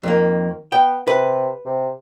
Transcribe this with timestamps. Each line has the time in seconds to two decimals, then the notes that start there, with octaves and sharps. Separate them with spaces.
0.03 F2 D#3 A#3
0.72 B3 G5
1.07 C3 B4
1.66 C3